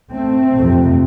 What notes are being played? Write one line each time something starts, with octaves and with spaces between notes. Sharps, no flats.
A3 C4
F2 C3